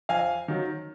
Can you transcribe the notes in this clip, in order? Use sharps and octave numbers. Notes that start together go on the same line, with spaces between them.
F2 F5 G#5
D#3 F#3